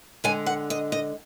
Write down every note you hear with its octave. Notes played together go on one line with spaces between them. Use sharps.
D3 G#3 G#5
F#5
D#5
D#5